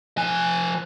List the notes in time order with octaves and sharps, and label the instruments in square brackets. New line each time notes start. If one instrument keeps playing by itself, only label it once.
[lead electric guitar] F3 G#5